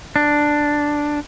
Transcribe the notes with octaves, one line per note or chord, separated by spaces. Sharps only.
D4